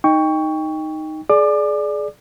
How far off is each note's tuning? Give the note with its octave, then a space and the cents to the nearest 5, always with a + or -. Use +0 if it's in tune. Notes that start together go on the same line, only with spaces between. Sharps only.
D#4 +0 G5 +20 C#6 +15
G#4 +25 D5 +0 D6 +30